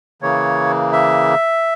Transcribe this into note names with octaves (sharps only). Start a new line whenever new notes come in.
C#3 E3 A#3 C#5
E5